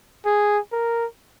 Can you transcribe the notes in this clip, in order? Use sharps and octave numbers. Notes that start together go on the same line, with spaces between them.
G#4
A#4